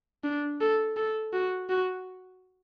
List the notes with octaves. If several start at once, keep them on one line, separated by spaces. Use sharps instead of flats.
D4
A4
A4
F#4
F#4